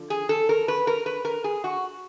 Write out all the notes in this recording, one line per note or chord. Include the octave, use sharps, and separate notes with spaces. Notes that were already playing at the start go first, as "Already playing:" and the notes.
Already playing: D3 F3
G#4
A4
A#4
B4
A#4
B4
A#4
G#4
F#4